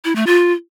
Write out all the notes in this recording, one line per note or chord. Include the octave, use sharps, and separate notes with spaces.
E4
A3
F4